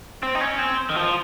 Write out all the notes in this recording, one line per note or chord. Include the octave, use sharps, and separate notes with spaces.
C4
D#4
C#4
C4
D#3
F3